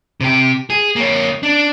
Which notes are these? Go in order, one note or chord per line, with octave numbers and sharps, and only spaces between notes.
C3 G4
G#4
A#3 C#5
D4